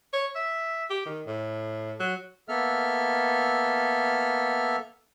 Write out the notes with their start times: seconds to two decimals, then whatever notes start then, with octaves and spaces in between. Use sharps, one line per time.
0.13 C#5
0.35 E5
0.90 G4
1.06 D#3
1.27 A2
1.99 F#3
2.48 A#3 B3 A4 E5 F6